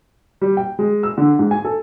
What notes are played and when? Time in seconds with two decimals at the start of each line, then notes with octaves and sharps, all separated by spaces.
0.41 G3
0.57 G5
0.79 G#3
1.03 E6
1.18 D3
1.39 G#2
1.51 G#5
1.64 A4